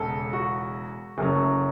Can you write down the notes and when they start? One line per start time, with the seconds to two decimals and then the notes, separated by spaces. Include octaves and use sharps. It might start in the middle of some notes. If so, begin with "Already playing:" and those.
Already playing: E1 E2 C#3 A4
0.33 F#4
1.18 F#1 F#2 F#3 A3 C#4